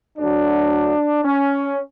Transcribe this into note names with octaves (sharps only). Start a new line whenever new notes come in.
D2 D3 F#3 D4
C#4